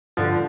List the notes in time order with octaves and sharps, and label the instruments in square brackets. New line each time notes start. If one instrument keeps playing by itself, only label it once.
[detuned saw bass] G2 [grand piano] D3 F3